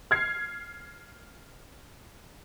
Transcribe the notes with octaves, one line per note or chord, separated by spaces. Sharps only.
F6 G#6 C7